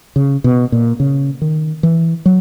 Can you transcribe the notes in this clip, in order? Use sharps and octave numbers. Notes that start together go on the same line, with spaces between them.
C#3
B2
A#2
C#3
D#3
E3
F#3